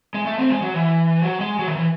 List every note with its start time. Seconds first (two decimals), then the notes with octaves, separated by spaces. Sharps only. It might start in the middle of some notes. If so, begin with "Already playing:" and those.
0.14 G#3
0.26 A3
0.38 C4
0.50 G#3
0.62 F#3
0.74 E3
1.22 F#3
1.40 G#3
1.59 F#3
1.67 D#3
1.76 E3